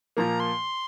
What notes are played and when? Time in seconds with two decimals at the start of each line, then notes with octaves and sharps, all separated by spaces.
0.17 A#2 F3 A#3 A#5
0.40 C6